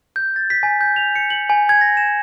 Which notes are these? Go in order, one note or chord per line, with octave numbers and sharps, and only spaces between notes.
G6
A6
B6
G#5
G6
F7
C#7
F#7
G#5
G#6
A#6
E7